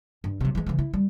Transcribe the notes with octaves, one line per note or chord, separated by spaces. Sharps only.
G2
C3 F#3
E3 G#3
C#3 E3
E4
G3